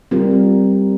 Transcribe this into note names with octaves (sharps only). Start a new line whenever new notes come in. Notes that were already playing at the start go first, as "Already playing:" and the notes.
G3 C4 F4 A#4